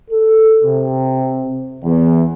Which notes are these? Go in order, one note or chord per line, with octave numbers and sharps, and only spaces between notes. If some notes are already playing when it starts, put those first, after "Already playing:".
A4
C3
E2